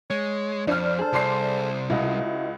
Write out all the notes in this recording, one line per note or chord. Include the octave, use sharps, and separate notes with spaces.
G#3 C#5
F2 D4 C5 F6
G#4 A4
C2 D5 C6 C7
C#2 E4 F#4 D#5